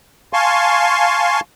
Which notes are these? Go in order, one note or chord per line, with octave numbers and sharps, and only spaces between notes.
F5 G#5 A5 C6 C#6